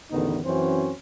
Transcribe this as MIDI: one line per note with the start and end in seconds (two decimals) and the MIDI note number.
0.12 0.40 33
0.12 0.40 40
0.12 0.40 50
0.12 0.40 51
0.12 0.40 59
0.12 0.40 63
0.44 0.93 42
0.44 0.93 52
0.44 0.93 60
0.44 0.93 61
0.44 0.93 66
0.44 0.93 72